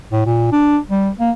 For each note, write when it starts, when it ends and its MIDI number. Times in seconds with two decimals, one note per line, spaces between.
0.12 0.23 45
0.26 0.50 46
0.52 0.78 62
0.89 1.10 55
1.20 1.31 58